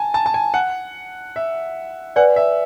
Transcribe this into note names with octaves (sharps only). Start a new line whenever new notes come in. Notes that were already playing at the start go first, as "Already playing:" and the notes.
Already playing: G#5 A5
A5
A5
G#5
F#5
E5
B4 D5 F#5 G#5
E5